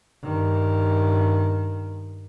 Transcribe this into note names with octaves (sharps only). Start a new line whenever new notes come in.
G2 D#3